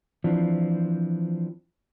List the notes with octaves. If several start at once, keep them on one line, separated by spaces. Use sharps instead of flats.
E3 F3 C4 D4